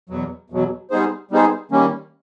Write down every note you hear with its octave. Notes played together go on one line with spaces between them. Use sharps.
E2 B2 F#3
E2 B2 F#3
G3 B3 D#4 G#4 C5
G3 B3 D#4 G#4 C5
D#3 G3 A#3 C#4